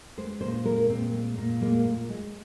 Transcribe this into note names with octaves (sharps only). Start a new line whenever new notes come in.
G#3 C5
A#2 C5
G#3 A#4
A#2 C4
G#3
A#2
G#3 A#3
A#2
G#3